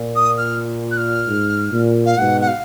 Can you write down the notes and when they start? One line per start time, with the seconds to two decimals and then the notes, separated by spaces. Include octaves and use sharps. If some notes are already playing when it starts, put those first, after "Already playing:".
Already playing: A#2
0.15 D#6
0.38 F6
0.91 F#6
0.97 F6
1.27 G#2
1.72 A#2
2.05 F5
2.17 G#2 B2 F#5
2.41 F#5
2.47 F5